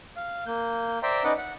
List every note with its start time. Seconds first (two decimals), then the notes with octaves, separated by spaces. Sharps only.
0.16 F5
0.47 A#3 G6
1.03 C5 D5 E5 G5 A#5 C6
1.24 C#4 D#4 B4 D5 D#5 F#5
1.38 F#5